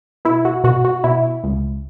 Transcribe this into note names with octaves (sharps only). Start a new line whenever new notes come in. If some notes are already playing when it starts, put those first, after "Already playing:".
B2 E4
F#4
B2 F#4
F#4
B2 E4
C#2